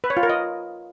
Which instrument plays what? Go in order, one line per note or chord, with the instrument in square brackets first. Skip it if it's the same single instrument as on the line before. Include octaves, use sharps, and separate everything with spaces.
[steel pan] B4
C#5
F4
A#4
D#5